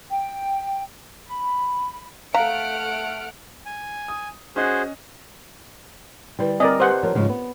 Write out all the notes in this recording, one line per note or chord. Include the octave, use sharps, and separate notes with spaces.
G5
B5
A3 F5 F#5 A#5 F6 D7
G#5
D#6
C#4 F#4 G#4 C5 D#5 F#6
D3 G3 E4 B4
C4 A#4 D5 D#5
G4 B4 C5 F#5 G#5
F3 A#4 C#5
G#2 C#3 F3
B3